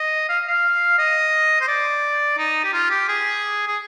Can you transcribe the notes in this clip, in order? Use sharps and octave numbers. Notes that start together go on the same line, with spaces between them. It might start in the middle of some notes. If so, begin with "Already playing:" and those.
Already playing: D#5
F5
F5
D#5
C5
D5
D#4
G4
F4
G4
G#4
G#4